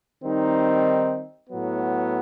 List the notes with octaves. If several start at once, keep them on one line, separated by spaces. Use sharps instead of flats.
D#3 G3 C4 D#4
A2 F#3 B3